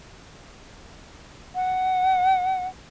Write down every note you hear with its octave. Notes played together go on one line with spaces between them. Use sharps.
F#5